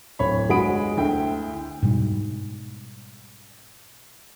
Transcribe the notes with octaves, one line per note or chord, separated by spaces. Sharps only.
D1 C#5 B5
G1 G#3 F#4 B5 D#6 D7
D2 E4 G5
G#2 B2 G3